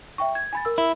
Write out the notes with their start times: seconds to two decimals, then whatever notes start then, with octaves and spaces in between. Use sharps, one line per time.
0.18 E5 G5 C#6
0.35 G#6
0.53 G#5 B5 A6
0.65 A#4 E6
0.78 E4